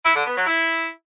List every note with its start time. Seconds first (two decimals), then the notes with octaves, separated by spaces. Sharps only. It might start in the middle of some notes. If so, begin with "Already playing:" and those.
0.05 E4
0.16 D3
0.26 B3
0.36 F#3
0.47 E4